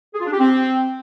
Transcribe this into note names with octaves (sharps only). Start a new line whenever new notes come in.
G#4
F4
D4
G4
C4